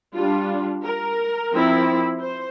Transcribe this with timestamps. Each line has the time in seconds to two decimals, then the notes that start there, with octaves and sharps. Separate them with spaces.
0.16 G3 D4 F4
0.84 A#4
1.52 F3 C4 E4
2.20 C5